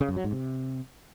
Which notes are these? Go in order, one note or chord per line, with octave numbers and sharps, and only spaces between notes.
C#3
F#2
F#3
G#2
C3